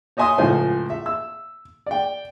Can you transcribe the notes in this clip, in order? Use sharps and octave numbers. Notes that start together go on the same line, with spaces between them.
C#5 D#5 E5 G#5 C6 D#6
C#2 A2 F3 C5 G#5
E5
E6
D5 G5